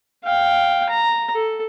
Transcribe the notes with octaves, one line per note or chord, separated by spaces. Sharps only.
F5 G5
A#5
A4